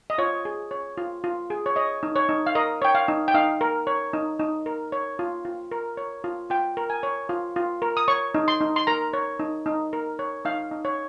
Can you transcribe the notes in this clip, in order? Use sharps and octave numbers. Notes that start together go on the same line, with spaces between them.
D#5
F4 C#5
G#4
C#5
F4
F4
G#4
C#5
C#5 D#5
D#4
C#5
D#4
F5
A#4 D#5
C#5 G5
F5
D#4
G5
D#4 F5
A#4
C#5
D#4
D#4
A#4
C#5
F4
F4
A#4
C#5
F4
F4 G5
A#4
G#5
C#5
F4
F4
A#4
D#6
C#5 C#6
D#4
C6
D#4
C6
A#4 A#5
C#5
D#4
D#4
A#4
C#5
D#4 F5
D#4
C#5